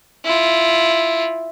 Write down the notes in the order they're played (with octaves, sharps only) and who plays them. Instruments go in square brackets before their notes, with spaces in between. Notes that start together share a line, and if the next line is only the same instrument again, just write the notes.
[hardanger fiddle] E4 F4